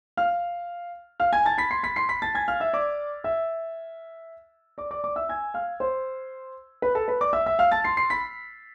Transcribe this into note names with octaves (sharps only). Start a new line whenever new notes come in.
F5 F6
F5 F6
G#5 G#6
A5 A6
B5 B6
C6 C7
B5 B6
C6 C7
B5 B6
A5 A6
G#5 G#6
F5 F6
E5 E6
D5 D6
E5 E6
D5 D6
D5 D6
D5 D6
E5 E6
G#5 G#6
F5 F6
C5 C6
B4 B5
A4 A5
B4 B5
D5 D6
E5 E6
E5 E6
F5 F6
A5 A6
C6 C7
C6 C7
B5 B6